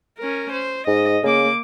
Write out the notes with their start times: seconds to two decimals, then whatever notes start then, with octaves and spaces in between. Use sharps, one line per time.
0.19 C#4 A#4
0.52 C5
0.87 G#2 D#5
1.23 C#3 A#3 D6